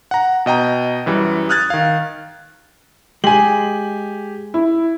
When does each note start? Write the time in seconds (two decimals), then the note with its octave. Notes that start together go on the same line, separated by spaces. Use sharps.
0.11 F#5 A#5
0.46 B2 D#5 G5 A#5
1.06 F#2 E3 G3
1.49 D#6 F6 F#6 G#6 A6
1.70 D#3 F5
3.24 G#3 G4 G#4 G#5 F#7
4.54 E4